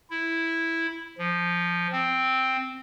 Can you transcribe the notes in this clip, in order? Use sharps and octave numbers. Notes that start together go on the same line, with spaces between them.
E4
F3
C4